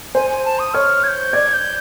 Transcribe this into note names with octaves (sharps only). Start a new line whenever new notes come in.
C5 G#5
G#5
A5
D#6
C#5 F6
G#6
G6
D5 G#6
G6